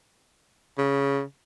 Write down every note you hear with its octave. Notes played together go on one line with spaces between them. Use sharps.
C#3